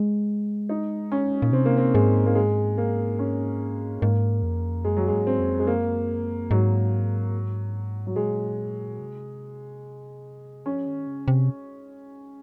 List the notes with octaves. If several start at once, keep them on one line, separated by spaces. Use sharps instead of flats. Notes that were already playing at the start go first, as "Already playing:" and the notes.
Already playing: G#3
D#4
C#4
A#2
C3 C4
A#3
C4
G#2 G#3
A#3
G#3
A#3
C#4
G#2 A#3
F2
F#2 G#3
F#3
G#2 G#3
C4
F2
G#3
F#2 A#3
G#2 F#3
F#3
A#2 G#3
C3
F3 C#4
D#3
C#3
C3